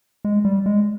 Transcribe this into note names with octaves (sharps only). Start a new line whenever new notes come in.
G#3
G3
G#3